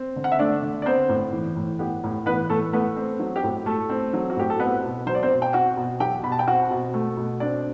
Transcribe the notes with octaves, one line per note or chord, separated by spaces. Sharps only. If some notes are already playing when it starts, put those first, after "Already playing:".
Already playing: C4
D3
F#5
E5
A3 D4 D5
D3
D5
B3 C4 C5
A2
E3
A2
B3 G4
A2
E3 B3 B4
A2 A3 A4
A3 B3 B4
C4
F#3
G4
A2
A3 A4
C4
F#3
F#4
A2 G4
A4
B3 C4 B4
B2
F#3 C5
D5
C4 C5
B2
G5
C4 F#4 F#5
B2
F#3 G4 G5
B2 B5
A5
G5
C4 F#4 F#5
B2
A3
B2
C4 D4 D5